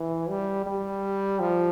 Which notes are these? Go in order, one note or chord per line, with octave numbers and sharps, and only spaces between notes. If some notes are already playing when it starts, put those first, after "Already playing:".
Already playing: E3
G3
G3
F3